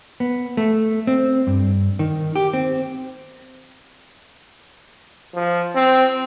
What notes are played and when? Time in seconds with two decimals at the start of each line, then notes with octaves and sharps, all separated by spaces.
0.20 B3
0.57 A3
1.07 C4
1.47 G2
1.99 D#3
2.36 G4
2.53 C4
5.34 F3
5.75 C4